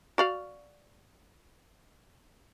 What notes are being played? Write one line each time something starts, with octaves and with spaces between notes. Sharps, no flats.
F#4 D5 F5